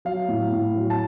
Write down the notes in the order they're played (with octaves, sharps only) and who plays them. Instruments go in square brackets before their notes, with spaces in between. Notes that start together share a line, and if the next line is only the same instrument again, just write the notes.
[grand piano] F#3 F5
A2
A2
F#3
A5